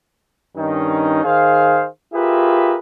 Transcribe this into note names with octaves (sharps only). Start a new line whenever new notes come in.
G2 D#3 C#4 D#4
D#3 G#4 C5 F5
F4 G4 G#4 A#4 B4 E5